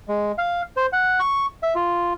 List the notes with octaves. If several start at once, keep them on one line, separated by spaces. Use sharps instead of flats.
G#3
F5
C5
F#5
C#6
E5
F4